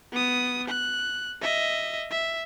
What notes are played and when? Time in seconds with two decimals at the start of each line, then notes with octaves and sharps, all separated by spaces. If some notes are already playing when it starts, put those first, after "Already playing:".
0.12 B3 D#6
0.68 F#6
1.42 D#5 E5
2.11 E5